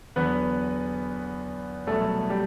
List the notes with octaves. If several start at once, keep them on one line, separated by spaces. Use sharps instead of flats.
E2 D3 F#3 B3 B4
C2 B2 F#3 A3 A4
G3 G4